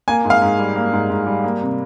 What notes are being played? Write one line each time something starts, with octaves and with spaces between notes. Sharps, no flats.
A#3 G#5
G#2
F5
G#2
G3
A#3
G#2
G#2
G3
A#3
C3